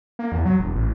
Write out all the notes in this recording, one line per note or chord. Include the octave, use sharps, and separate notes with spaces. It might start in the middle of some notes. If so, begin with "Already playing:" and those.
A#3
E2
F#3
E1
A1